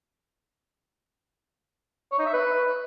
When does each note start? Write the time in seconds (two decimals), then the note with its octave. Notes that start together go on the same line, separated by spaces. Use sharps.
2.12 C#5
2.19 D#4
2.26 E5
2.33 B4